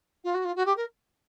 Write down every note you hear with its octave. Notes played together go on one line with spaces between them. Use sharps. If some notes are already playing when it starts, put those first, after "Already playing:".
F4
F#4
F4
F#4
G4
A#4